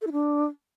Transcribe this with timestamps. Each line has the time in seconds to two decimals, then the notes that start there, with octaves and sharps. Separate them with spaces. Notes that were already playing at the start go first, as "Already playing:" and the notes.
0.02 A4
0.07 E4
0.12 D4